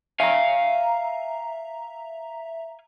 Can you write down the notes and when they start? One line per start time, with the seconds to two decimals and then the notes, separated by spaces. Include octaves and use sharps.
0.20 E5 F5 G#5 A#5